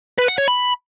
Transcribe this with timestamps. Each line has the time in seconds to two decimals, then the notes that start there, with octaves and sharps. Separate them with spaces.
0.19 B4
0.28 F#5
0.38 C#5
0.48 B5